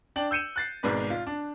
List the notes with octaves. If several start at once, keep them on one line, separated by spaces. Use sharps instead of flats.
D4 D5 G5 F#7
E6 G6 C#7 D#7 E7
F#6 A6 C7
G#1 G#2 B2 B4 D5
F4
D4